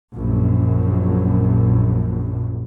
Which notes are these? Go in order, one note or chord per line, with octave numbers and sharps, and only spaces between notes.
A#1 F#2